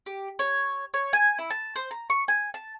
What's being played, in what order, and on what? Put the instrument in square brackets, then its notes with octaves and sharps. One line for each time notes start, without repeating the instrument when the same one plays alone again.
[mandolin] G4
C#5
C#5
G#5
E4
A5
C5
A#5
C#6
G#5
A5